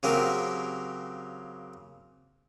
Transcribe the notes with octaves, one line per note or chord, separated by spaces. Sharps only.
C#3 F#3 A#3 C4 G4 A#4